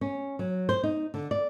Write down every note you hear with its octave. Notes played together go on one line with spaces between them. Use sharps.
C#4
F#3
C5
D#4
D3
D5